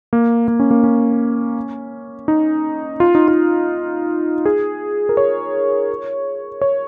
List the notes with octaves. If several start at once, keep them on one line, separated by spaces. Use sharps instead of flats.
A#3
A#3
C#4
A#3
C#4
D#4
F4
D#4
F4
G#4
A#4
C#5
C#5